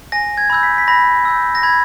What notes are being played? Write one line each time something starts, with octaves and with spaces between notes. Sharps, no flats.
G#5 A#6
G#6
B5 E6 G6
B6
B6
B5 A#6
E6 G6
A#6
B5 G#6